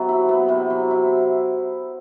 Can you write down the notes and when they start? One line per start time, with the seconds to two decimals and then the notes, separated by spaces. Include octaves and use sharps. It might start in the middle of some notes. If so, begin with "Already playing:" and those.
Already playing: C3 F#3 B3
0.09 E4
0.29 B3
0.49 C3
0.70 F#3
0.91 E4